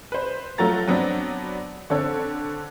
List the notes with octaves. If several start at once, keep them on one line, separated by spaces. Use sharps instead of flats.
B4 C5
F#3 A3 F4 A#5 A6
F#3 B3 C4 D4
D3 C4 A4 C#5